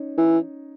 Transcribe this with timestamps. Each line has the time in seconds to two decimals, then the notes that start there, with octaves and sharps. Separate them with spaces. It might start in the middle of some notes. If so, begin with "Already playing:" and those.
Already playing: C#4 D#4
0.17 E3